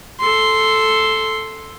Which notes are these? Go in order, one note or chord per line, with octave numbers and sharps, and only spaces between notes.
A4 C6